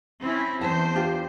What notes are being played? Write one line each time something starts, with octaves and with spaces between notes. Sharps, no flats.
C4 C#4 E4
E2 C5 A5
D4 F4 G4